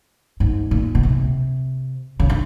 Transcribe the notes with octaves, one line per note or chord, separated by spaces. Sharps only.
G#2
A#2
B2
C3
C#3
D3